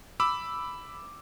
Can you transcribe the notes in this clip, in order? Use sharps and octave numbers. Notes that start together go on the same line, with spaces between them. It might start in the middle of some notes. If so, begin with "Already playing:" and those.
B5 D6 E6